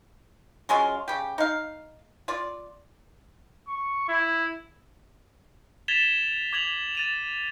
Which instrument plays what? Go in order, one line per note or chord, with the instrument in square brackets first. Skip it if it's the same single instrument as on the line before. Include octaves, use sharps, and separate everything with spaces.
[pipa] F#3 G#3 C#4 F4
C#3 G4
D#4 F5
F4 D5
[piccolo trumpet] C#6
E4
[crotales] G#6 A6 B6 E7 F7 G7
D6 G#6 F7 F#7
A6 D#7 F7